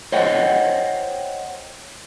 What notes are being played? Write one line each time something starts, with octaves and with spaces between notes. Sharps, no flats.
C5 C#5 D#5 E5 F#5 G5